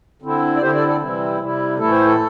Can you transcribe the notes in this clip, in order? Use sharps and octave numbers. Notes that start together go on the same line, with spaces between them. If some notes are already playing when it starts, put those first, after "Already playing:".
D3 C4 E4
D5
D3 C4 E4 G4 C5
A4 D5
A4 D5
C3 E3 G3 C4 E4
C3 G3 E4
A2 E3 A3 E4 A4
C5
A4